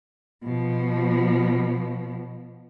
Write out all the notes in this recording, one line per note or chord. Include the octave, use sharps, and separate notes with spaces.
B2 F3